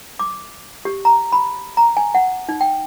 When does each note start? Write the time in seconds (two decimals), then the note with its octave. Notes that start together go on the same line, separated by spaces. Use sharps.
0.19 D6
0.85 G4
1.05 A#5
1.32 B5
1.77 A#5
1.97 G#5
2.15 F#5
2.49 D#4
2.61 G5